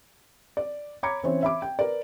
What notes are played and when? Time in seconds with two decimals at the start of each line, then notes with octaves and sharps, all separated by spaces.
0.57 D5
1.03 C#5 A#5 B5 D6 G#6 C#7
1.24 E3 C4 C#4 C5 C#5
1.42 E5 B5 D6
1.62 G5
1.79 A#4 B4 D5